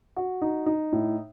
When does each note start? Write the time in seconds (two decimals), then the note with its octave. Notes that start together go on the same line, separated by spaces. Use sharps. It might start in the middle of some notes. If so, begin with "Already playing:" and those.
0.16 F#4
0.42 D#4
0.66 D#4
0.92 A2